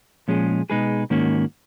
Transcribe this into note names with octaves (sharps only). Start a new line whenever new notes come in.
A#2 F3 G#3 C#4 G#4
B2 G#3 D#4 G#4 B4
G#2 D#3 A#3 C#4 F#4